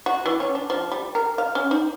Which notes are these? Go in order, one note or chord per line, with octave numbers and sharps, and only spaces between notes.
F#4
E3
C#4
D4
F3
G3
A#4
F5
C#4
D#4